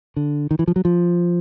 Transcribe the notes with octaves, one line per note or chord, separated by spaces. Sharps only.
D3
D#3
E3
F3
F#3
F3